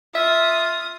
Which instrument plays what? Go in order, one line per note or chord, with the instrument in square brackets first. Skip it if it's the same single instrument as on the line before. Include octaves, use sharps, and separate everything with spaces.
[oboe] F4 [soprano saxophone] E5 [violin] D#6